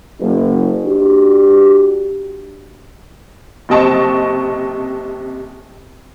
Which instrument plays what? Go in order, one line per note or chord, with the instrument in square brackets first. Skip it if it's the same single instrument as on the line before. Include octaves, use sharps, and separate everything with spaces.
[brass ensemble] F#1
D4 F#4 G4
[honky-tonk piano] F#1 C3 C4 D#5 A5 C#6